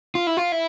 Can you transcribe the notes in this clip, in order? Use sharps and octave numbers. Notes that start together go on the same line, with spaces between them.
F4
E4
F4
E4